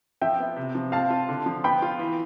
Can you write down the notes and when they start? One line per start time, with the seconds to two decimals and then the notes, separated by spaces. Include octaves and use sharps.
0.22 F3 E5 G5
0.39 B3
0.56 C3
0.75 F3
0.92 C4 F5 A5
1.10 F4
1.29 D3
1.46 F3
1.64 B3 G5 B5
1.82 F4
1.99 E3